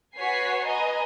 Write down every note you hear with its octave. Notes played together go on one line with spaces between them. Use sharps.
F#4 B4 C#5 G#5 B6 C7
B4 D#5 G#5 A#5